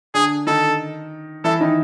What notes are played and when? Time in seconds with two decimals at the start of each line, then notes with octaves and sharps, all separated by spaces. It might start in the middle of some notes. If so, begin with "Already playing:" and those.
0.14 D3 D4 G#4
0.47 D#3 D#4 A4
1.44 E3 E4 A4
1.60 D#3 D#4